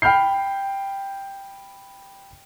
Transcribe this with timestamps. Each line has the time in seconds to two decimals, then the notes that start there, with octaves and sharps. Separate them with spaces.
0.02 G5 B5 F6 G6 C7